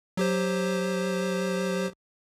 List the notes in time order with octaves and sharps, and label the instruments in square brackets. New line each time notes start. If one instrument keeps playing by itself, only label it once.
[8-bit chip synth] F#3 G4 C5